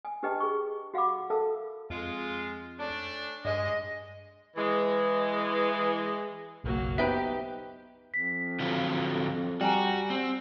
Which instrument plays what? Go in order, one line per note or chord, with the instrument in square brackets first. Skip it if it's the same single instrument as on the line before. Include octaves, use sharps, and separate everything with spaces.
[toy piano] G#5
D4 G4 B4 D#5 G5 A5
G#4 C#6
F#4 F5 F#5 B5 D6
A4 A#4 E5 F5 A5
[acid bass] F2 [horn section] G#3 F4
[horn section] A3 C#4 D4
[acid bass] G2 [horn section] G#3 [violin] D#5
[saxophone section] E3 G#3
[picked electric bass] F#1 B1 [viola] F#3 A#3
[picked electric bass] B3 [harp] D#4 B4 G5 [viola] G4 [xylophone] E5
[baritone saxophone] F2 [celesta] B6
[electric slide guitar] D3 F#3 F4
[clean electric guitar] G3 [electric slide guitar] F#4 [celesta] G5 G#5 A#5
[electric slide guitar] C4